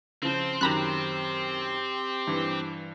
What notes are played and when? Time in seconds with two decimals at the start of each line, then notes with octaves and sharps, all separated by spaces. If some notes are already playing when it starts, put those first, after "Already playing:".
0.23 C#3 F3 C4 C5
0.61 F#2 D#3 G4 A#5 B5 F#6
2.27 G2 E3